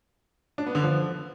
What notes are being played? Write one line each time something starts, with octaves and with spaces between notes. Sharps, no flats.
D4
B3
D3
F3